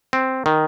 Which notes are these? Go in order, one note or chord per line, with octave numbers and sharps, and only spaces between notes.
C4
D#3